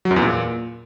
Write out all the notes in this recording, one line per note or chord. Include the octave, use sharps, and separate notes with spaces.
F#3
F#2
E2
A#2